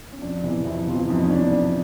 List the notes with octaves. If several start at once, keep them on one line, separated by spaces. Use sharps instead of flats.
C#4
F2 D4
C3 E3
F2 E4
C3 E3 F4
F4
F2 D#4
C#4
C3 E3 D4
F2 D4